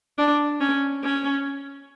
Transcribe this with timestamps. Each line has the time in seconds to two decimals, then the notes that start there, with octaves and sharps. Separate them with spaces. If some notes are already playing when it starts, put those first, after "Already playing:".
0.18 D4
0.60 C#4
1.03 C#4